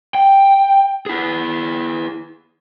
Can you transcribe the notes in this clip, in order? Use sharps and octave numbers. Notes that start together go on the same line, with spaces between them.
G5
E4 G#4